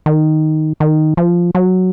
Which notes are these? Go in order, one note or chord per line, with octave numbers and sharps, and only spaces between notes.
D#3
D#3
F3
F#3